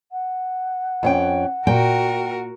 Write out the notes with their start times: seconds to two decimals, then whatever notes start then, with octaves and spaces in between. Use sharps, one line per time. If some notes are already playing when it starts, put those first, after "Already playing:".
0.12 F#5
1.03 F2 C#4 G5
1.67 A#2 F#4 A#4 G5